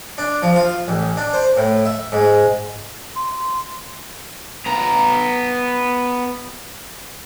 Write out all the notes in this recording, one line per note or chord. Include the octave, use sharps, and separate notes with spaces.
D4
F3
F4
A1
D4
C5
A2
E5
G#2
C6
B3 A#5